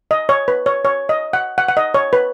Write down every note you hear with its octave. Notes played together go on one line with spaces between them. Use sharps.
D#5
C#5
B4
C#5
C#5
D#5
F#5
F#5
F#5
D#5
C#5
B4